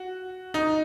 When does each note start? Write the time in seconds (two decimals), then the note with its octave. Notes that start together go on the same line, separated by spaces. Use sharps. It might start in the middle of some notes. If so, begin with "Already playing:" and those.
Already playing: F#4
0.54 D#4